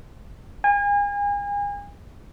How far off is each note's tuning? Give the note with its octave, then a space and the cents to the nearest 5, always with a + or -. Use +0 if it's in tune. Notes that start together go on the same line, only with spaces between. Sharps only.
G#5 -35